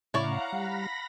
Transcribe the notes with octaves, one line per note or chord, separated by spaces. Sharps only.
A2 C#3 E4 C#5 D5 F5 F#5 A#5
G3 B5 A#6